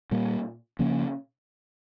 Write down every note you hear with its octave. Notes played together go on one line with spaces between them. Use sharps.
A#2 G3 A#3
C#3 F3 A#3 C#4